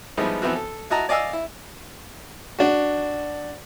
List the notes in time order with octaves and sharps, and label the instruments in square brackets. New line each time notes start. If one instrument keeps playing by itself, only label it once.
[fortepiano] F3 G3 G#3 B3 D#4 E4
E3 F3 B3 C4 E4 F#4
A4
E4 F#4 D#5 A5 A#5
D5 D#5 F5 G#5 D6 E6
E4
D4 F#4